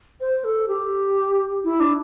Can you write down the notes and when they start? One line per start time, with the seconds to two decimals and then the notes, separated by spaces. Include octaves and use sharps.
0.21 C5
0.44 A4
0.68 G4
1.64 E4
1.80 D4